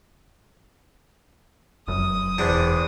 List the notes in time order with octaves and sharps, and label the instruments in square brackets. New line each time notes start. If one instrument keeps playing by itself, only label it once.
[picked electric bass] F1 F#2 [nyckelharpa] D#6
[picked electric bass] E1 [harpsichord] E2 C3 D4